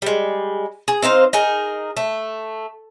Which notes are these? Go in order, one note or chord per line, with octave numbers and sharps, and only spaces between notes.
G3 G#3
G#4
C4 D#4 C5 F5
D#4 G#4 A#4
A3